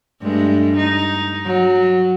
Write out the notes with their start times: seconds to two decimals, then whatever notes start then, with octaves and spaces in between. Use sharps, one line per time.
0.22 G2 G#3 A3
0.76 D#4
1.45 F#3